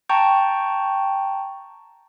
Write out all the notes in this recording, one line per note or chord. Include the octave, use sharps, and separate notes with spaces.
G5 A5 A#5 C#6 G6